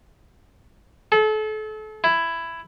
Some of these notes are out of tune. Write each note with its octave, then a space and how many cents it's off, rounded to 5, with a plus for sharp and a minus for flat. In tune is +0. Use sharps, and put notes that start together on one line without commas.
A4 -35
E4 +10